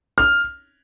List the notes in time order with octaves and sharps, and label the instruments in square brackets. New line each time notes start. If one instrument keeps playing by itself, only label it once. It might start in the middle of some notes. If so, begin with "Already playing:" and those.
[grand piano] F6